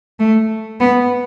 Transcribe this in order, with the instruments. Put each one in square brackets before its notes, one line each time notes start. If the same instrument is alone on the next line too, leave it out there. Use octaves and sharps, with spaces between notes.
[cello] A3
B3